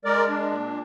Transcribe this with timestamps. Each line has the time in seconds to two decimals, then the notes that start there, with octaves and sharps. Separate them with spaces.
0.05 G#3 A#4 D5
0.28 D4
0.50 A#2